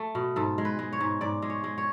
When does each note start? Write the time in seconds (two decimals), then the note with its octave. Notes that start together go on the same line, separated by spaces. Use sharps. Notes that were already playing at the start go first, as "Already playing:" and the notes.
Already playing: A3
0.15 B2
0.36 G#2 A4
0.58 G#3
0.65 B4
0.79 G#3
0.93 C#5
1.01 G#2
1.21 G#2 D5
1.42 G#3
1.50 C#5
1.64 G#3
1.78 C#5